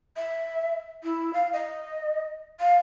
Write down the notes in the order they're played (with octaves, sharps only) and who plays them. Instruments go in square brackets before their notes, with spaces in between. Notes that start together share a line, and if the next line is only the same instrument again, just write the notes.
[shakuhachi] E5
E4
F5
D#5
F5